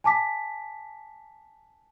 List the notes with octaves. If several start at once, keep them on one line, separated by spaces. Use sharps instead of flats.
G#5 A5 D6 B6